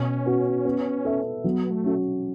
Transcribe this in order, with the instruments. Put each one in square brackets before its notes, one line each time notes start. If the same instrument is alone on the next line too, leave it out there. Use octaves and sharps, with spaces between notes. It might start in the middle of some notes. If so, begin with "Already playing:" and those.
Already playing: [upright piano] B2 [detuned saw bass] C#4
[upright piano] B3 F#4
B3
A4 E5
[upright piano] F#3 [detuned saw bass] B3
[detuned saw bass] A3
[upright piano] C#4 F#4